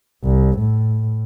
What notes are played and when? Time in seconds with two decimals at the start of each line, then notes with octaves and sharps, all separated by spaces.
0.24 C2
0.58 A2